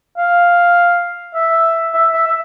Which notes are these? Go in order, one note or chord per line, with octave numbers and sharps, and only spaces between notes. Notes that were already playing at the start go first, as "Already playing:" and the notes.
F5
E5
E5
E5
E5